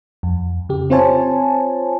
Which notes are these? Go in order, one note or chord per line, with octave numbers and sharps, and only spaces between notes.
F2
C#3 G4
C4 F4 C5 C#5 G#5 A5